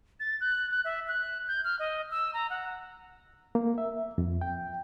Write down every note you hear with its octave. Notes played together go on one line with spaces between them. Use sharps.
A6
F#6
F#6
E5
F#6
G6
F6
D#5
E6
A#5
F#5
A#3
E5
F2
G5